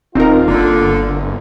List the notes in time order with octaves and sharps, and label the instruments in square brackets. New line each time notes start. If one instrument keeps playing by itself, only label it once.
[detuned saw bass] D#1 [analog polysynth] C4 D#4 A#4 [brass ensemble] F4
[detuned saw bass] G1 [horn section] D3 [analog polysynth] A#3